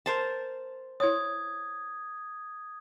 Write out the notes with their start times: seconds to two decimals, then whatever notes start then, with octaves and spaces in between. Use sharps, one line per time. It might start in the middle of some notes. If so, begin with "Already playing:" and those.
0.06 A#4 C5 A5
1.00 E4 C#5 D#6 G#6